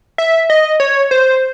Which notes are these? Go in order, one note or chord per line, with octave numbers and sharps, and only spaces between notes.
E5
D#5
C#5
C5